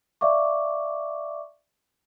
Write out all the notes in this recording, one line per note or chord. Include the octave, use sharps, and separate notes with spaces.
D5 E5 F5 C#6 D6